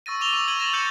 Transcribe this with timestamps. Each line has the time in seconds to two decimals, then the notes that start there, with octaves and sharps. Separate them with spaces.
0.06 C#6 E6 A6 A#6 D#7
0.20 C#6 D6 F7 G7
0.33 C#6 D6 E6
0.48 G#6 D#7 F#7 G7
0.59 A6 A#6 E7 F#7 G7
0.73 E6 G6 A6 C#7 F7 F#7